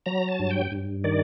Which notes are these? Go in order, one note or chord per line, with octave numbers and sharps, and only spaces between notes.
F#3 A#5
A5
G2
G5
G2
D#3 D5